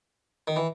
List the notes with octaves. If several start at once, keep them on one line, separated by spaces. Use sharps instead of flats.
D#3
E3